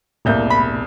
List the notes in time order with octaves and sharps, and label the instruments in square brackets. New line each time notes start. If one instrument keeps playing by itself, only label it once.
[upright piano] E1 C2 G6 [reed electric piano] A2 A#3
[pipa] B5